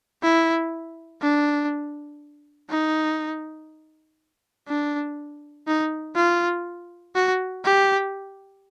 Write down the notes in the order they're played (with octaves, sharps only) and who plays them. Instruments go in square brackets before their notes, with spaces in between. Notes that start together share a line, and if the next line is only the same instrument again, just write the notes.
[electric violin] E4
D4
D#4
D4
D#4
F4
F#4
G4